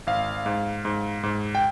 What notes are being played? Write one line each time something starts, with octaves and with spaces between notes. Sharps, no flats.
G#1 F5
G#2
G#2
G#2
G5